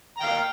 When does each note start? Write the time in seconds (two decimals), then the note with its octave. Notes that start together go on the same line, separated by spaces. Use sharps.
0.17 A#5
0.20 G5
0.23 F5